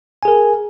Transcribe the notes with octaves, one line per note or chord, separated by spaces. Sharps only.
G#4 A#4 G#5